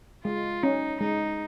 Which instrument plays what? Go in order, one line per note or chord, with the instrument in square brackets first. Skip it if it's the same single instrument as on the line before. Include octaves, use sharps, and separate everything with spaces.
[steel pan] G#3 [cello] F4
[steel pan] C#4 [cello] D#4
[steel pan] G#3 [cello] D#4